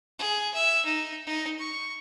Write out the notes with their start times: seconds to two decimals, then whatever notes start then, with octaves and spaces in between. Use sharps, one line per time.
0.19 G#4
0.54 E5
0.85 D#4
1.27 D#4
1.59 C#6